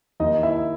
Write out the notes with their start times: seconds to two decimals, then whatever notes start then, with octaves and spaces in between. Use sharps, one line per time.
0.20 D#2 D#4 D#5
0.43 E4 E5